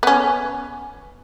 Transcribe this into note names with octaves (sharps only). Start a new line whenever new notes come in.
B3 C#4